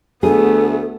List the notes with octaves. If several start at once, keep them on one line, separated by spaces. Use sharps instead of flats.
D2 A3 B3 G#4 A4